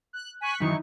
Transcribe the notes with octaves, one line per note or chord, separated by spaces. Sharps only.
F#6
G#5 C#6 F#6 B6
F#2 D#3 E3 D#4 E4 C#6